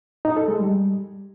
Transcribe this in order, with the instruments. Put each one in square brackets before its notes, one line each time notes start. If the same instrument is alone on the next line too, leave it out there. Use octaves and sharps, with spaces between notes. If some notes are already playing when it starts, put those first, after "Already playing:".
[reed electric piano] D#4
A4
G#3
G3